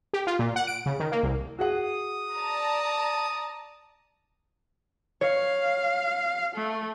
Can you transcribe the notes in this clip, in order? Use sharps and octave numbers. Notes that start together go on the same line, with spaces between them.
G4
F4
A#2
F#5
D7
C#3
D#3
A#3
C2
F#4 G#4 F#5 D#6
D5 A5 A#5
C#5 F5
A3